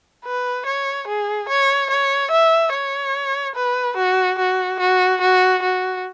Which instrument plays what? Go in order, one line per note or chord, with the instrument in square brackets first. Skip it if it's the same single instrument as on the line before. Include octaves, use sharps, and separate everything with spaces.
[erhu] B4
C#5
G#4
C#5
C#5
E5
C#5
B4
F#4
F#4
F#4
F#4
F#4